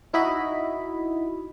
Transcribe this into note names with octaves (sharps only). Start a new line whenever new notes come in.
D#4 E4 F#4 D#5 B5